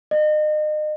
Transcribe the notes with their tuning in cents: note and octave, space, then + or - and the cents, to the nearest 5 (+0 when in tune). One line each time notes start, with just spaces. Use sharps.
D#5 -35